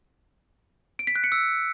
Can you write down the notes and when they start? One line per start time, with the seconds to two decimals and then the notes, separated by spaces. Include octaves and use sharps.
0.99 D7
1.07 B6
1.16 F#6
1.24 C#7
1.32 E6